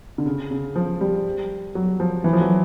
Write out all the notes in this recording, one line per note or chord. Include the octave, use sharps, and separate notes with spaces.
D3
C#3
C#3
F3
G3
F#3
F3
E3
F3
F#3